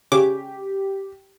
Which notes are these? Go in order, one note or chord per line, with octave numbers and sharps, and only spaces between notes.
C#3 G4 D6